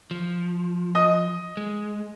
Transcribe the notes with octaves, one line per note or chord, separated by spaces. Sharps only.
F3
D#5 D#6
G#3